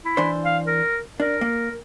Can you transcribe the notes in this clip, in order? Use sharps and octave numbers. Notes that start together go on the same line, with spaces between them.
E4
E3 D4 C5
F5
A#4
D4 A#4
A#3